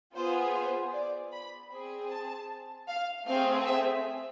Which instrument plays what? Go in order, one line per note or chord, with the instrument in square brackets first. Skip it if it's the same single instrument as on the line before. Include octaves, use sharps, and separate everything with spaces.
[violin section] B3 F4 G#4 C5
C5
D5
B5
C4 G#4
A5
F5
A3 C4 G#4 F5
E5